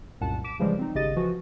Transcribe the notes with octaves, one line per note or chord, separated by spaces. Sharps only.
C2 F#2 A#2 F#5 A5
D6 B6 D7 E7
C#3 E3 F3 G3 G#3
C4 D#4
G#1 C#3 G4 D#5 A6 D#7
E3 F3 F#4